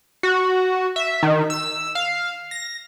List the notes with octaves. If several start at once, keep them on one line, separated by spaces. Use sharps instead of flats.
F#4
E5
D#3
E6
F5
A#6